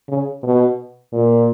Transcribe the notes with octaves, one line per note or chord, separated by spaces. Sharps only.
C#3
B2
A#2